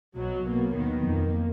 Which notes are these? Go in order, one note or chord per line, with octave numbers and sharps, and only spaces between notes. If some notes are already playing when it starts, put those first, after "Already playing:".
B1 B2 F#3
B1 B2 A#3
D#2 D#3 F#3 B3
F2 F3 A#3